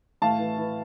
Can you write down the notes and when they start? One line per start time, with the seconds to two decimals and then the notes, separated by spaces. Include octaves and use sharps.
0.22 A2 F5 A5
0.39 E3
0.58 E3